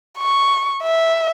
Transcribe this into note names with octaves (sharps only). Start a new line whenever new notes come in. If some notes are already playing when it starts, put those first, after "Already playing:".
C#6
E5